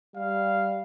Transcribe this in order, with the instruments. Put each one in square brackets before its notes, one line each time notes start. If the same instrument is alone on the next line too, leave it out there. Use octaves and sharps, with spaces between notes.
[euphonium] G3 [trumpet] F5